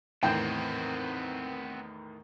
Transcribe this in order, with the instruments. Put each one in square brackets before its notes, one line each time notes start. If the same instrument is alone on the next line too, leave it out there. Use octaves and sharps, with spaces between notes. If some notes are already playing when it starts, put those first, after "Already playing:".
[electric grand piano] E2 A2 D#3 [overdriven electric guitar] B3 C4 [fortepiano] G5